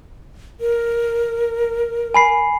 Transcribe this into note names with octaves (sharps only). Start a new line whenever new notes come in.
A#4
G#5 B5 C7